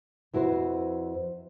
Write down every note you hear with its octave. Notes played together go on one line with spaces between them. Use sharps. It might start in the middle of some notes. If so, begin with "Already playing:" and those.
F2 E4 F#4 B4 C5